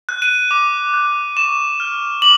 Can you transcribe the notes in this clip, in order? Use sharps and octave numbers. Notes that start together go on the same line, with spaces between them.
F#6
D#7
D6
F#6
C#6 E7
F6
D6 F#7